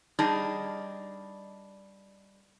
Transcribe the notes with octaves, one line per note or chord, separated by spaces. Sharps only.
G3 D4 D#4 G#4 D#5